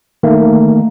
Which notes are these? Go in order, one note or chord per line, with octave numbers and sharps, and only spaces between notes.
D#3 A3 A#3